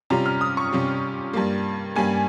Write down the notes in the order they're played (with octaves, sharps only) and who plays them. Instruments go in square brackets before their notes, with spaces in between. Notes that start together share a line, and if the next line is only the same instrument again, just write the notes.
[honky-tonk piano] C3 G3 C#4 F4 A#5
F6
D#6
C#6
C3 G3 C#4 F4
G2 G3 A#3
G2 G3 A#3 G#5